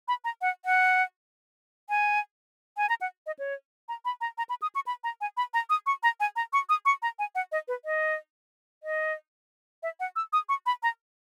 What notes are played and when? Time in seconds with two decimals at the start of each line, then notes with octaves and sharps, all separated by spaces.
0.08 B5
0.24 A#5
0.42 F#5
0.65 F#5
1.89 G#5
2.77 G#5
2.89 A#5
3.01 F#5
3.26 D#5
3.39 C#5
3.89 A#5
4.05 B5
4.21 A#5
4.38 A#5
4.49 B5
4.62 D#6
4.75 C#6
4.87 B5
5.04 A#5
5.21 G#5
5.37 B5
5.54 A#5
5.70 D#6
5.86 C#6
6.03 A#5
6.20 G#5
6.36 A#5
6.53 C#6
6.69 D#6
6.85 C#6
7.02 A#5
7.19 G#5
7.35 F#5
7.52 D#5
7.68 B4
7.85 D#5
8.83 D#5
9.83 E5
10.00 F#5
10.16 E6
10.33 D#6
10.49 C#6
10.66 B5
10.83 A#5